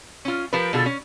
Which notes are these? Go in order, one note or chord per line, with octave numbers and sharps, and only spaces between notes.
C#4 F4
F3 G4 A#4 B4
B2 D3 F4 G#4 A4
C#4